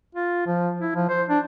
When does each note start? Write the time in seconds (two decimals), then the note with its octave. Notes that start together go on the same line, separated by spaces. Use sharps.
0.15 F4
0.47 F3
0.81 E4
0.95 F3
1.09 C5
1.29 D4